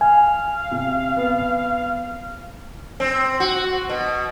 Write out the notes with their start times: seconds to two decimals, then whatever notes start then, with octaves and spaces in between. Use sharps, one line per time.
0.01 F5 G#5
0.71 C3
1.16 B3
3.00 C4
3.40 F#4
3.89 B2